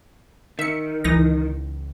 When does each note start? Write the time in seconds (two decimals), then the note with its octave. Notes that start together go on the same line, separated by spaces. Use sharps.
0.59 D#3 E5 C#7
1.04 C#2 E3 D#4 A#6